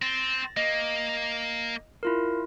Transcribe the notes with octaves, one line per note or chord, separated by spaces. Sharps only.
C4 A6 A#6
A#3 D#5
E4 F4 A#4